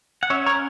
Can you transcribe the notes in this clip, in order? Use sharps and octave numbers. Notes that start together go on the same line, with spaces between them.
F#5
C#4 C#5 E5
A#4 C#5